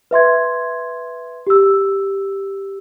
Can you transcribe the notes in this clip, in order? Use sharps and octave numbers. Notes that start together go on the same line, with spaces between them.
B4 E5 C6 G#6
G4 E6